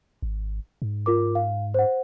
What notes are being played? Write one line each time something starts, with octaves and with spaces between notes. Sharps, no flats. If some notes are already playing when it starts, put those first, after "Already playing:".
G#1
G#2
F4 A#4 D6
F5
C5 F#5